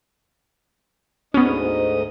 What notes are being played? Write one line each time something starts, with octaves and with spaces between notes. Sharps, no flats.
D2 G#2 B3 C#4 D#5